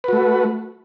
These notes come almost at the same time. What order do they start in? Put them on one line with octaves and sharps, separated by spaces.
B4 F#4 A3